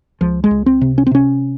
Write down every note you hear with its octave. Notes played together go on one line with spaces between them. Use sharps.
C#2 F3
G#3
C#2
C4
C3
C#4
C4
C3 C#4